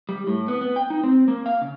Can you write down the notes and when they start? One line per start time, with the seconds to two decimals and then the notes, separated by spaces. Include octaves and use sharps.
0.09 G3
0.27 A2
0.48 B3
0.61 B3
0.76 G5
0.90 D#4
1.03 C4
1.28 A#3
1.46 F5
1.62 C#3